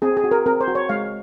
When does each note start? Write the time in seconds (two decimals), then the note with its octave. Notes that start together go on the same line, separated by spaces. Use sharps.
0.02 C4 G#4
0.17 G#4
0.24 F#4
0.31 A#4
0.46 C4 A#4
0.61 C5
0.68 F#4
0.75 C#5
0.89 G#3 F5